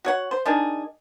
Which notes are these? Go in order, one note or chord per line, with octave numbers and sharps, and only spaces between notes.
F#4 C#5 F#5
C5
D#3 D4 G#4